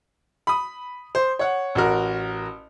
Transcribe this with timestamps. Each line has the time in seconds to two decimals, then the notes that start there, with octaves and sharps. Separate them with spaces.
0.47 B5 D#6
1.15 C5
1.39 C#5 F#5
1.75 A1 F#4 A#4